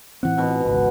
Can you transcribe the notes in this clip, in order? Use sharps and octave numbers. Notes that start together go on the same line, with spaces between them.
A2 E3 C4 F#5
G#2 B2
G#1 C#2